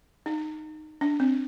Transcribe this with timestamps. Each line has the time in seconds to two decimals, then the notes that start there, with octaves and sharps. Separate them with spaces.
0.26 D#4
1.01 D4
1.20 C4